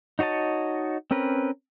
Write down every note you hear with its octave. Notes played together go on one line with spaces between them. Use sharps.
D#4 F#4 C#5 D#5 A5
C4 C#4 A#4 B4